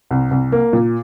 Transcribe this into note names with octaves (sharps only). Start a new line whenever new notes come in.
C2
C2
A#3
A#2